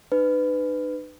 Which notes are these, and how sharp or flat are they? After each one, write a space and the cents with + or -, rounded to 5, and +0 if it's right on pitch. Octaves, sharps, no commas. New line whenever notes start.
D#4 -45 B4 +20